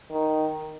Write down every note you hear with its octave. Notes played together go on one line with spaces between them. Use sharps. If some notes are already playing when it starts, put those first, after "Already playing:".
D#3